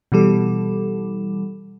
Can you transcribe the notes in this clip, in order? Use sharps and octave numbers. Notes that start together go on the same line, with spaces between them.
B2 E3 G3 A4